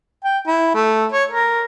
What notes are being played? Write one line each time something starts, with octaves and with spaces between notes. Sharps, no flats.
G5
E4
A3
C#5
A#4